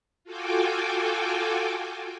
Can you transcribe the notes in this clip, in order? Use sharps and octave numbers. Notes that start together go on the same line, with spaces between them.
F4 F#4 A4 G5 G#5 D6